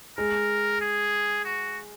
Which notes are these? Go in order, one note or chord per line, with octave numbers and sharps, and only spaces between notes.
G#3 A#4
G#4
F#4